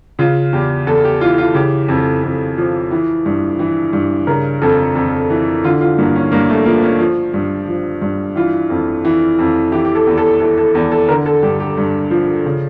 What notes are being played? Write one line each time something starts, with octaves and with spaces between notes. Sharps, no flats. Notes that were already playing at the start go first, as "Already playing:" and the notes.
C#3 F4
E2 G4
E2 A4
G4
E3 F4
F4
C#3 G4
F2
F2
F3
E3
G2
E3
G2
C#3 A#4
F2 A4
F2
E3
D3 F4
F4
G2 A#3
C#4
G2 A#3
A3
F3 A#3
C#4
F3
G2
F3
G2
E3 F4
F2
E3
F2
E3 G4
G4
A4
E2
A4
E3 A4
A4
E2
A4
D3 A#4
A4
G2 G4
G4
G2
F3
C#3